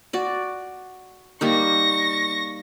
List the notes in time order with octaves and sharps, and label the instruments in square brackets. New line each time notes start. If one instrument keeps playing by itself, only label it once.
[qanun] F#4 D5
[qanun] G3 A#3 D#4 [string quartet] C#6 A#6